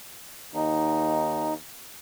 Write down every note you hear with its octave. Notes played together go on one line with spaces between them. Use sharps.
D#2 D#4